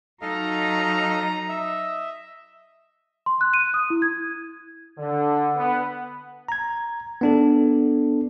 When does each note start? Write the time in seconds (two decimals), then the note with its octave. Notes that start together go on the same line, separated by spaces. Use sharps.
0.22 F#3 D#4 A4 D#5 F5 A#5
1.49 D#5 E5
3.26 C6
3.41 F#6
3.54 D#7
3.74 D#6
3.90 E4
4.02 G#6
4.98 D3
5.56 B3
6.48 A#5 G#6
7.21 B3 D4 A4